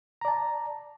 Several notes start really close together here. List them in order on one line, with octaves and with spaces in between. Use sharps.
A#5 D5 A5